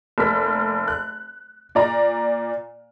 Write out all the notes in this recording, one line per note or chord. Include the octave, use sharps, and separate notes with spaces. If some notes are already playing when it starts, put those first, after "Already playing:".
F1 A#3 B6
F#6
A#2 D5 A#5